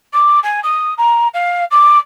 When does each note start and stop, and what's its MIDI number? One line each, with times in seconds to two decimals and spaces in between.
0.13 0.39 86
0.43 0.60 80
0.63 0.94 87
0.98 1.28 82
1.34 1.64 77
1.71 1.98 86